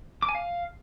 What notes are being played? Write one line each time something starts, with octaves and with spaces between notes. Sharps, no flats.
D6
G#5
F5